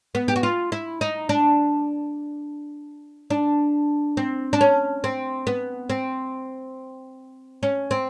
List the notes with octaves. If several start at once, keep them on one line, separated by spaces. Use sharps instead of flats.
B3
G4
F#4
F4
E4
D#4
D4
D4
C4
D4
C#4
C4
B3
C4
C#4
C4